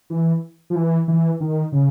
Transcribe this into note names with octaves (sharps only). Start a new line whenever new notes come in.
E3
F3
E3
E3
D#3
C#3